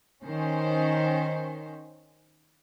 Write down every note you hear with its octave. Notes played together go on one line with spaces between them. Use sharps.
D#3 C#4 C5